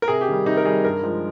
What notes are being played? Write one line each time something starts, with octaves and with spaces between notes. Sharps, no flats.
A#4
C3 G#4
G4
D#3 G3
C3 D#4
A#4
D#3 G3 G#4
G2 A#4
F3 G#3